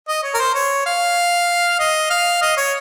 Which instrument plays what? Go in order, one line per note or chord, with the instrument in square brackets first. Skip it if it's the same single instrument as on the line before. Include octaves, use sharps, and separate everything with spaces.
[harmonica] D#5
C#5
A#4
C5
C#5
F5
D#5
F5
D#5
C#5